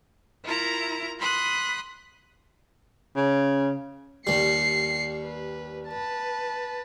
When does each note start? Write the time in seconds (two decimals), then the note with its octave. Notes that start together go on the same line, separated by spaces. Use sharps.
0.44 E4 F4 A#4 A#5
1.19 B5 C6 D#6 F#6
3.16 C#3
4.27 D#2 G3 C7 C#7
5.23 B4
5.89 B4 A5